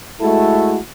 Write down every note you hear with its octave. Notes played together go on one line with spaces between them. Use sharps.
G#3 A3 E4 F#4 A4